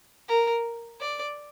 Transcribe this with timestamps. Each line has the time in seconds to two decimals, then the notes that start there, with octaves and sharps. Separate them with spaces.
0.28 A#4
1.00 D5